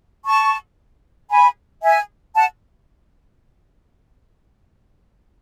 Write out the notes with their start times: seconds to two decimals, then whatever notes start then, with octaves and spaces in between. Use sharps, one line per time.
0.25 A5 C#6
1.30 G#5 B5
1.83 E5 G#5
2.35 F#5 A5